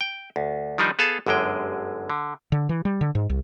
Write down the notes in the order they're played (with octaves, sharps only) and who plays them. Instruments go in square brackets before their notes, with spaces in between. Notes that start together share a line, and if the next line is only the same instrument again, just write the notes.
[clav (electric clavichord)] G5
D2
D#3 F3 G3 D4 D#4
B3 G#4 A4 F5 A5
G1 F#2 D3 G#3 G5
D3
[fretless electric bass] D3
E3
G3
D3
G#2
C2